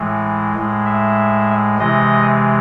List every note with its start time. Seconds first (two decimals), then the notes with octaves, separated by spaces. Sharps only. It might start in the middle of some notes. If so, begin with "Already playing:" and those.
Already playing: A2 E3 G#3
0.55 A2 G#3
0.86 E5
1.78 C3 E3 G#3 D#5